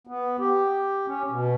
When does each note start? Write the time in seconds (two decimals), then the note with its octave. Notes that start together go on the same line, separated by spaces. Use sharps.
0.07 B3
0.40 G4
1.07 C#4
1.30 B2